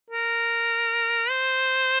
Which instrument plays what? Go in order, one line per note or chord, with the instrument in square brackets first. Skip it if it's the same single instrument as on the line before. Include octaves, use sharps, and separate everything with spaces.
[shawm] A#4
C5